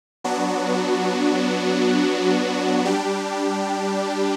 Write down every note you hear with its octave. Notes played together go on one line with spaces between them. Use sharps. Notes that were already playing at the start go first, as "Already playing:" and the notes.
F#3 B3 D4 F#4
G3 D4 G4